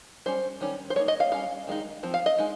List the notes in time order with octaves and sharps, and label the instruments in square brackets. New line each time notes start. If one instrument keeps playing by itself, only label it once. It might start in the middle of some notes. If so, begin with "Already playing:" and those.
[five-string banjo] G3 C#4 C5
D#3 G3 C#4
C5
G3 A#3 D#4 C#5
D#5
F5
G3 C#4 F5
D#3 G#3 D#4
F3 C4
F5
D#5
G#3 D#4